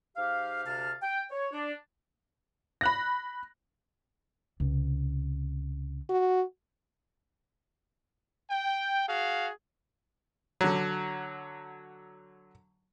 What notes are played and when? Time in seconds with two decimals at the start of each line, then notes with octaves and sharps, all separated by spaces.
0.16 G#2 G4 F5
0.66 D2 C3 F5 A5 F6
1.03 G5
1.31 C#5
1.53 D4
2.81 B5 F#6 A#6
4.60 C#2 C3
6.09 F#4
8.51 G5
9.09 F#4 G#4 F5
10.61 D3 F#3